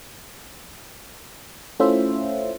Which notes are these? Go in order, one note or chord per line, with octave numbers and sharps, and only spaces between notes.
A3 C#4 E4 F4 C5 E5